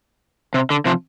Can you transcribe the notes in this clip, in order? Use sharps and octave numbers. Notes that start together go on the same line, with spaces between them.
C3
D3
C3 F3